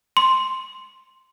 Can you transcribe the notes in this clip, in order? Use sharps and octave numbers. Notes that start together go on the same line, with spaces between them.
C6